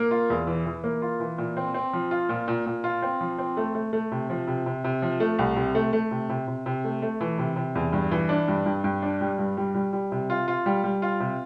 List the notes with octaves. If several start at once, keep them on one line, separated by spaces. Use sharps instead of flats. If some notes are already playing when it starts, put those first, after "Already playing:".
Already playing: A#3
F4
E2
E3
E3
A#3
F4
E3
A#2
C4
C4
F3
F4
A#2
A#2
A#2
F4
C4
F3
C4
A3
A3
A3
C3
F3
C3
C3
C3
F3
A3
C2
C3
A3
A3
C3
C3
C3
C3
A3
A3
E3
C3
C3
E2
G2
E3
D4
G2
G2
G2
D4
G3
G2
G3
G3
G3
C3
F4
F4
G3
G3
F4
C3